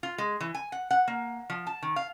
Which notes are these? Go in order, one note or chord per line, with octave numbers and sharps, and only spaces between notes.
F4
G#3
E3
G#5
F#5
F#5
A#3
F3
A5
D#3
F5